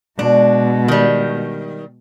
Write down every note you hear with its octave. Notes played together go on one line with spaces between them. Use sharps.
B2 G#3 D4
D#3 G3